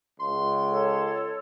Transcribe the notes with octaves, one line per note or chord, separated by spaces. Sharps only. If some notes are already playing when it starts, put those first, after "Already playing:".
C#2 C6
A4 C#5